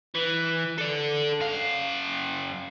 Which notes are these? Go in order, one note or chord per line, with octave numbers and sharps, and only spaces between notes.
E3
A4 D5
F#2 F5